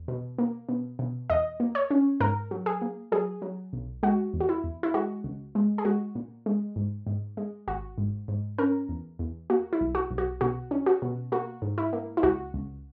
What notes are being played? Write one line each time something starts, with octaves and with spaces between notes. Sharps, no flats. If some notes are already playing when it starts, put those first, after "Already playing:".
Already playing: E2
B2
A#3
B2
B2
E2 D#5
A#3
C#5
C#4
G#2 A#4
F#3
G#4
A#3
F#3 G#4
F#3
B1
G#3 F#4
E2
F#4
E4
E2
E4
G#3 F#4
C#2
G#3
G#4
G#3 F#4
A#2
G#3
G#2
G#2
G#3
G#1 F#4
G#2
G#2
C#4 A#4
E2
E2
A#3 F#4
E4
B1
F#4
B1
F#4
B2 F#4
C#4
F#4
B2
A#3 F#4
G#2
E4
A#3
E4
C#2 F#4
C#2